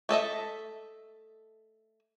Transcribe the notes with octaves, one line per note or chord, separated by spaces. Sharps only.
A3 A4 D#5 E5